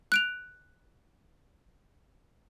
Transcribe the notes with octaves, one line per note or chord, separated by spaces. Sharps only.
F#6 D7 F7